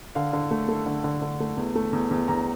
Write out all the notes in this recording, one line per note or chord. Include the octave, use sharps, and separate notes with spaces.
D3 F5
D3
A3
A3
D3
D3
D3
A3
E2
A3
E2
E2
E2 A#5